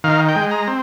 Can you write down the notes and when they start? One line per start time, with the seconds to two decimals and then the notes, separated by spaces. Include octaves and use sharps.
0.04 D#3 F5
0.29 G5
0.36 G#3
0.51 A#5
0.67 C4